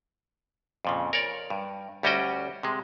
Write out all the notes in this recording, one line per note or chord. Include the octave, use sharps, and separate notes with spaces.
F2 A#2 C#3
A#4 C#5 D5
G2
D2 G3 C#4 F#4 D#5 G5
C3 G#3